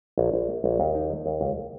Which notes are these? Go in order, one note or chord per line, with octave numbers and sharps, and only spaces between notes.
A#1
A#1
A#3
A#1
D#2
D#4
D#3
D#2
C#2